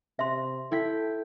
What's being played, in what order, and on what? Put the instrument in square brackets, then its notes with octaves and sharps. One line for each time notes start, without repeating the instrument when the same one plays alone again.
[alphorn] C3 [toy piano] E5 C6
[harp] E4 G5 B6 [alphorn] A4